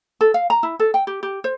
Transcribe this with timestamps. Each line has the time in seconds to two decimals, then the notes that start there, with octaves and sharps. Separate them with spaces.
0.21 A4
0.34 F5
0.50 A#5
0.63 E4
0.80 A4
0.94 G5
1.07 G4
1.23 G4
1.44 C5